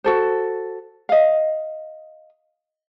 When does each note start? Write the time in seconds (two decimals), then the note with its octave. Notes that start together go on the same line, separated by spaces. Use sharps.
0.04 F#4 A4 C5
1.09 D#5 F5